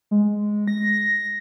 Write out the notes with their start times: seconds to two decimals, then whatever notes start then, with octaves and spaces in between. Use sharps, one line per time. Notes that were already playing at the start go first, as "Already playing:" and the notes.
0.11 G#3
0.68 A#6